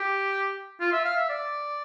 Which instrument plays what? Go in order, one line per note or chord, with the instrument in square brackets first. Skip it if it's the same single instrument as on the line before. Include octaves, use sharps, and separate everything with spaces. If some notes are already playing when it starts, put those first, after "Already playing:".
Already playing: [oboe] G4
F4
E5
F5
E5
D5